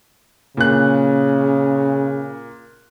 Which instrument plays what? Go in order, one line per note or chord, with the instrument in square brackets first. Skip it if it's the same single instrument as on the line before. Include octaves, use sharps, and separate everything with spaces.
[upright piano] A#2 F#6 [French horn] C#3